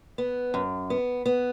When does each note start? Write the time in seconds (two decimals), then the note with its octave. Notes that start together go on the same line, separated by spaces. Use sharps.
0.18 B3
0.54 F#2
0.90 B3
1.26 B3